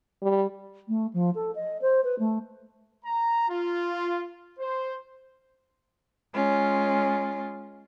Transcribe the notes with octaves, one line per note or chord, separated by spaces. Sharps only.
G3
A3
F3
A4
D#5
C5
B4
A3
A#5
F4
C5
G#3 C#4 F4